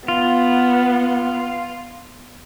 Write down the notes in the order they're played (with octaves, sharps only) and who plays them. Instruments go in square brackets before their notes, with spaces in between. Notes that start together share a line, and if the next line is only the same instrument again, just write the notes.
[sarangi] B3 [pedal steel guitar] F4